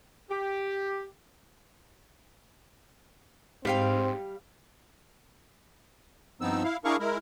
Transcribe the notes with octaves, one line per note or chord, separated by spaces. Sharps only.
G4
G#2 G3 C4 F5 G5
G2 F3 B3 C4 D#4 E6
E4 F5
D4 E4 G#4 A#4 F5 C#6
G#3 E4 A#4